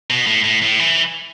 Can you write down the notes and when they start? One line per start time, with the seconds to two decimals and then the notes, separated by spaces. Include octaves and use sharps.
0.10 B2
0.27 A2
0.44 A2
0.62 A2
0.80 E3